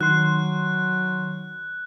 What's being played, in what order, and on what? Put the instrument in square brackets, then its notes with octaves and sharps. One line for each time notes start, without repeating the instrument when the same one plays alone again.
[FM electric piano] D#3 C6 [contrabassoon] F#3 [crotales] F#6